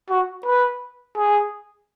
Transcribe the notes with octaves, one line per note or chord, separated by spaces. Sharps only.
F#4
B4
G#4